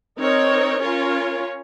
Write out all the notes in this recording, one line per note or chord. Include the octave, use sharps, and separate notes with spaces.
C4 D#4 A#4 C#5
C#4 F4 A#4 C#5